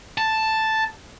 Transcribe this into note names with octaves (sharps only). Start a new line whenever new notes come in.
A5